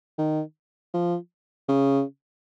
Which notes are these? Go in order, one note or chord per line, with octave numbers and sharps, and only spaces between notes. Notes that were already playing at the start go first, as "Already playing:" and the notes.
D#3
F3
C#3